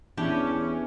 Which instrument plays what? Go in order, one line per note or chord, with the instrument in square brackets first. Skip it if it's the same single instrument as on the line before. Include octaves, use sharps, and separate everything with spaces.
[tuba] E2 [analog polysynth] E3 C#4 [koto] D4 G4